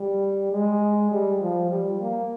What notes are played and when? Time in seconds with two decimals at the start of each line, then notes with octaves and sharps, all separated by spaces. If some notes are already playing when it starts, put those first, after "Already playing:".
Already playing: G3
0.52 G#3
1.12 G3
1.41 F3
1.71 G3
2.01 A#3